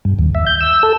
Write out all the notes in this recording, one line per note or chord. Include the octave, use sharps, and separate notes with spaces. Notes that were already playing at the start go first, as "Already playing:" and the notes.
G2
D#2
E5
G6
E6
A4